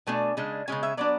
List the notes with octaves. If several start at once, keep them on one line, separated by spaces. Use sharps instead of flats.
B2 A3 D4 G#5
C#3 G#3 D4
C#3 G#3 C#4 G#5
E5
F#3 B3 D4 D5